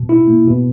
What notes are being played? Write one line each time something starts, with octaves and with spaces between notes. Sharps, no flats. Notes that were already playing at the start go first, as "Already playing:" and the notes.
Already playing: B2
E4
A#3
B2